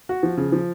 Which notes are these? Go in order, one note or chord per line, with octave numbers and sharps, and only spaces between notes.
F#4
F3
C#3
F3